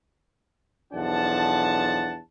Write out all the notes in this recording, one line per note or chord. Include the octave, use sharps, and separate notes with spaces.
B1 E2 F3 D4 F#5 A5